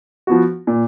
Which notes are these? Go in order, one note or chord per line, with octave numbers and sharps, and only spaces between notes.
F3 B3 F#4
A#2